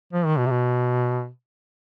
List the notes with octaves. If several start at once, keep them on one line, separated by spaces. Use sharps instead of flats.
F3
D#3
B2
C3
B2